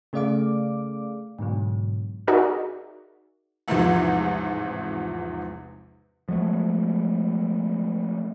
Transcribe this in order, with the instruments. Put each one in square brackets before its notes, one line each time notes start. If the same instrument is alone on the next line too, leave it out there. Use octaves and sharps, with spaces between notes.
[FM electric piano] C#3 A3 G#4 D5 F5 D6
G#2 B2 D3 F#3
[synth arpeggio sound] D#4 F#4 G#4 A#4 D5 E5
[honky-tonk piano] A1 E2 G#2 C3 E3 F3
[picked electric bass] F3 F#3 G#3 A3